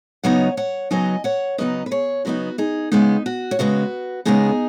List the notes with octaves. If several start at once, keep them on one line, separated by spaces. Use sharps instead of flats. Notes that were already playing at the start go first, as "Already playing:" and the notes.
C#3 F#3 B3 D#4 C#5 F#5
C#5 F#5
C#3 F#3 B3 D#4 D#5 G#5
C#5 F#5
C#3 F#3 B3 D#4 B4 D#5
B4
G#4 C#5
C#3 F#3 B3 D#4 F#4 B4
D#4 G#4
C#3 G#3 B3 D#4
F#4
C#5
C#3 G#3 B3 F#4 B4
C#3 G#3 B3 D#4 G#4